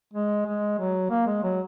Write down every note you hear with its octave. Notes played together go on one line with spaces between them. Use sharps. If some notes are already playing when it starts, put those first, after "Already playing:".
G#3
G#3
F#3
A#3
G#3
F#3